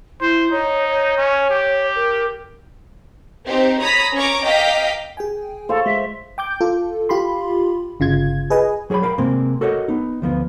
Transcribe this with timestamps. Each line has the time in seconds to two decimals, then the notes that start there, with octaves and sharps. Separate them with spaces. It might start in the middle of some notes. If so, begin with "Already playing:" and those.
0.21 E4 C5
0.51 D#4 C#5
0.87 C#5
1.17 C#4
1.50 G4
1.96 A#4
3.46 C4 D#4 G4 C5
3.80 C#5 A#5 B5 D#6 B6
4.15 C#4 C#5 A#5 C#6 D6
4.45 D#5 F5 G5 A#5 D6 B6
5.17 G#4 G5 G#5
5.69 A4 C5 F5 C#6
5.86 G#3 E5
6.38 G5 D6 G6
6.61 F4 A4
7.09 F4 G4 B5 C6
8.00 G1 C#3 F4 G#6
8.50 G#4 B4 D#5 G#5
8.90 F#3 G#4 C#5 G5 B5
9.02 A#4 F5 G5 G#5 B5
9.18 C3 G#3 A#3 C4
9.61 F#4 A4 A#4 C#5 D#5 F#5
9.88 B3 D#4
10.22 D2 F3 B3